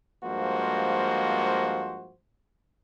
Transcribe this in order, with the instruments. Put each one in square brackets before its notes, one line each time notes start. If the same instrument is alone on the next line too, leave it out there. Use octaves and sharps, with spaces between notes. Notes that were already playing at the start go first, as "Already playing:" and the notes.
[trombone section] G2 F3 G#3 A#3 F#4 C5